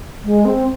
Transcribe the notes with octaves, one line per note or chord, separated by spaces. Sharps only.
G#3
C4